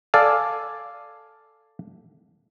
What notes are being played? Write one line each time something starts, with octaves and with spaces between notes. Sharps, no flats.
A4 D5 F5 G#5